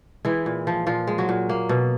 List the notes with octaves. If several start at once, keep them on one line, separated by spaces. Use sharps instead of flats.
E3 G#3 E4
A#2
F3
A#2 F3 F4
G#3
F#3 F#4
A#2
A#3
B2